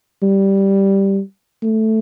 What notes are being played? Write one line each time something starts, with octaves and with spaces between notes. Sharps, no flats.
G3
A3